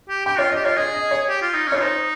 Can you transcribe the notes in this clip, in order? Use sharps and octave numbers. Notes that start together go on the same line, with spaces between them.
G4
G4 G5
F4 C#5
D#5
G4
F4 C#5
G#4 D#5
D#5
C#5
G4
F4
D#4
C#4 C#5
F4
D#4 C5